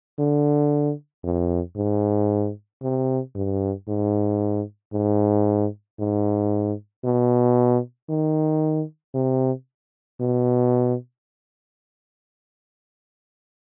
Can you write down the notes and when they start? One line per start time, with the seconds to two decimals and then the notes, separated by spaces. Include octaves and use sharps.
0.19 D3
1.24 F2
1.76 G#2
2.82 C3
3.35 G2
3.88 G#2
4.93 G#2
5.99 G#2
7.04 B2
8.09 D#3
9.15 C3
10.20 B2